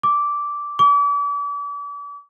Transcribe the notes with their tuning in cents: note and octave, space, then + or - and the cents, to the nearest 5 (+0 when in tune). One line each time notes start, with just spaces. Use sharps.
D6 -10
D6 -40